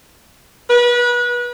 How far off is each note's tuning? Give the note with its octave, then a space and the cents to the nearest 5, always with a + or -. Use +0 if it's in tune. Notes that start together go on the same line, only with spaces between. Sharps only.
B4 -30